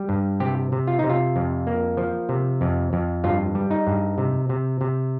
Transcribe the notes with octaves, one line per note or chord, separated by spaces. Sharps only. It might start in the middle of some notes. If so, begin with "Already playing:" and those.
Already playing: G3
G2
C3 G4
C3
F4
C3 D#4
F4
F2
A#3
F3
C3
F2
F2
G2 F4
G3
D#4
G2
C3
C3
C3